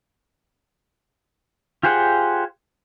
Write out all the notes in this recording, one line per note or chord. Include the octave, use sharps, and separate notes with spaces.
F4 G4 G#4 C5 F#5